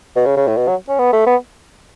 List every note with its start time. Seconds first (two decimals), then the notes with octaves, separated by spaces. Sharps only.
0.16 B2
0.26 C#3
0.37 C#3
0.47 A2
0.57 B2
0.68 F#3
0.88 C#4
0.99 B3
1.13 A3
1.26 B3